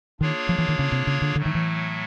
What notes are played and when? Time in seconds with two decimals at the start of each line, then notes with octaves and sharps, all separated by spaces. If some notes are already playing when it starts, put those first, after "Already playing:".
0.21 D#3 A#3 D4 F4 G#4 C#5
0.49 F3
0.58 E3
0.69 D#3
0.79 C#3
0.92 C3
1.07 C#3
1.22 D3
1.36 A2 D3 F#3 A3
1.46 D#3
1.55 E3